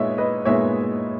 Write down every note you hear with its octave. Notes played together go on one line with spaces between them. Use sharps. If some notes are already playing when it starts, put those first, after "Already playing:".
Already playing: A#2 G#3 B3 D#4 C#5 E5
B4 D#5
A#2 G#3 B3 D#4 C#5 E5